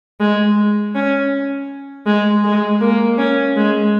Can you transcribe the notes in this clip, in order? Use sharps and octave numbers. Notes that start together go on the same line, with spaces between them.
G#3
C#4
G#3
G#3
A#3
C#4
G#3